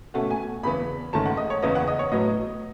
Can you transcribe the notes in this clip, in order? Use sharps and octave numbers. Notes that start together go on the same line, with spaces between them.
B2 A3 C#4 F#5
G#5
E2 C#3 E3 B3 B5
G#2 D#3 A3 C#4 A5
F#5
D#5
C#5
E2 C#3 E3 B3 D#5
F#5
D#5
C#5
A2 F#3 B3 D#5